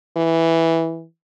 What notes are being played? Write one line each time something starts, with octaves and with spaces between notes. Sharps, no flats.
E3